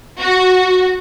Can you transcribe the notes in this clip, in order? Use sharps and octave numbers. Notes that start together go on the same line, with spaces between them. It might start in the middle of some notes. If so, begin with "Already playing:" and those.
F#4